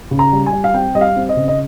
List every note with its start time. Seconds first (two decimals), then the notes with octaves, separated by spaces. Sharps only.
0.11 C#3
0.19 A#5
0.33 G3
0.46 G#5
0.53 G3
0.64 F5
0.74 C4 G5
0.95 G3 D#5
1.01 F5
1.16 C4
1.29 D#5
1.36 C#3
1.48 D#5